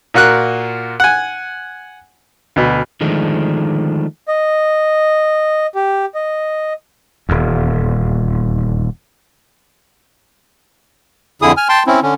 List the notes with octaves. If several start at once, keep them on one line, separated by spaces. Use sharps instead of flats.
A#2 F4 F#4 A#4 F#6
F#5 G#5
D2 B2
D3 D#3 F3 G#3 A3 D4
D#5
G4
D#5
D#1 E2
F2 D3 E4 G#4 D#6
G#5 F6
G5 A5 C6
C4 C#4 E4
D3 C#4